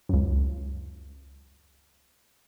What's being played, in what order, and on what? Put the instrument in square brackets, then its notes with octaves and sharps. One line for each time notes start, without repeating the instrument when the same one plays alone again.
[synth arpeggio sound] C#2 F#2